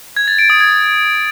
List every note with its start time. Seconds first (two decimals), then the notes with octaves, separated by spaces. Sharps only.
0.17 G#6
0.28 A6
0.39 D7
0.50 D#6
0.61 G#6